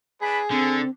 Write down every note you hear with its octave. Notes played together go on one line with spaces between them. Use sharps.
D4 G#4 B4 B5
D3 C4 A4